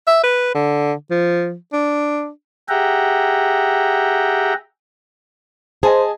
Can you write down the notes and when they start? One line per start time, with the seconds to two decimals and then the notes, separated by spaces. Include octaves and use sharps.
0.07 E5
0.24 B4
0.55 D3
1.11 F3
1.73 D4
2.69 G4 G#4 E5 F#5 G5 A#5
5.83 G#4 C5 D#5 G#5 A5